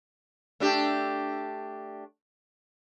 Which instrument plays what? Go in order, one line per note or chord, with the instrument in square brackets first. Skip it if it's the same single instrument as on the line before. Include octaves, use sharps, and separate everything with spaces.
[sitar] A3 D4 G4